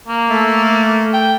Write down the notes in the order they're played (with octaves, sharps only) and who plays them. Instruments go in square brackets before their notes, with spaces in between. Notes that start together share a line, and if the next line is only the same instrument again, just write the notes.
[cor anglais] A#3
[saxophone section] A3
[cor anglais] G5